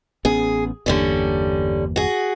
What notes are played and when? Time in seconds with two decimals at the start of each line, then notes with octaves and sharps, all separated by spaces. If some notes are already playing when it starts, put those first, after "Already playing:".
0.25 A1 B3 C#4 G#4
0.86 G1 E2 D3 G3 A#3 C#4
1.96 F#4 G#4